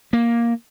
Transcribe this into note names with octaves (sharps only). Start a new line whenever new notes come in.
A#3